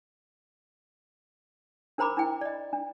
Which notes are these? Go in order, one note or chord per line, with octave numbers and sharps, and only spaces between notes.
D4 A#4 C5 A#5 B5 D6
D4 E4 G5
D5 D#5
D4